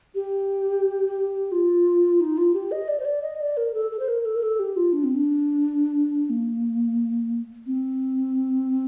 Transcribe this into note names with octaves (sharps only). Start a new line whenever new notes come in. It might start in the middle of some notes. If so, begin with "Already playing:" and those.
G4
F4
D#4
F4
G4
D#5
D5
C5
D5
D#5
D5
A#4
A4
A4
C5
A#4
A4
A#4
A4
G4
F4
D4
C4
D4
A#3
C4